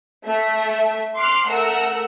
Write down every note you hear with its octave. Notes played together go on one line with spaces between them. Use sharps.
A3 E5
C6 D6 F6 F#6
A3 A#4 F#5 E6